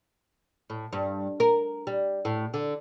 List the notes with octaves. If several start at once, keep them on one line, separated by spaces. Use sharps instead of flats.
A2
G2
A#4
G3
A2
D3